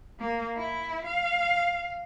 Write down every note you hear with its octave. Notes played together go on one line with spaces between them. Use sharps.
A#3
E4
F5